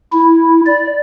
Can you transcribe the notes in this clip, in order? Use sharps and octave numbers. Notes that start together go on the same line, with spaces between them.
E4
D5